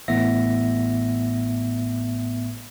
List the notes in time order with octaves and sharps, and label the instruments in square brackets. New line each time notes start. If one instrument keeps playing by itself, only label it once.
[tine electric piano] A1 A2 B3 E5 A#6